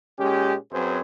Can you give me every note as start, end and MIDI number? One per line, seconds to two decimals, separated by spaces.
0.20 0.55 46
0.20 0.55 56
0.20 0.55 61
0.20 0.55 67
0.72 1.00 42
0.72 1.00 54
0.72 1.00 60
0.72 1.00 68
0.72 1.00 71
0.72 1.00 72